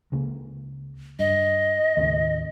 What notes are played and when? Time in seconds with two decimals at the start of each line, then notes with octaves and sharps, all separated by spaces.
0.12 C#2 C#3 A#3
1.19 G2 D#5
1.97 D#2 A2 C#3